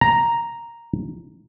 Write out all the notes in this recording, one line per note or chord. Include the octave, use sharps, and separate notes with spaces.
A#5